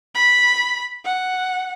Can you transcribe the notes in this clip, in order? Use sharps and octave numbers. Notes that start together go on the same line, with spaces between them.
B5
F#5